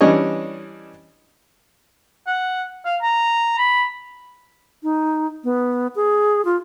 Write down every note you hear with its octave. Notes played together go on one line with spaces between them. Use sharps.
E3 G3 C#4 D4 C#5 D#5
F#5
F5
A#5
B5
D#4
B3
G#4
F4